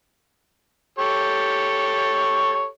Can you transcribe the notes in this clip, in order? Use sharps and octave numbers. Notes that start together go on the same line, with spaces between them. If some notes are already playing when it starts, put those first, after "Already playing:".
G4 A4 C#5